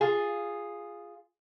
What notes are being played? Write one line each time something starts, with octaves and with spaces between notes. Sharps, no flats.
F4 G#4